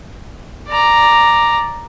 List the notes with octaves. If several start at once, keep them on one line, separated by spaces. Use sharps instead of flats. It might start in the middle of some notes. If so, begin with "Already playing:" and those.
D5 A#5